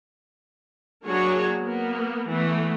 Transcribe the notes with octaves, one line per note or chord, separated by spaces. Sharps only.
F#3 A#3 D4 F#4 G#4 C#5
A#3 B3
E3 A3 B3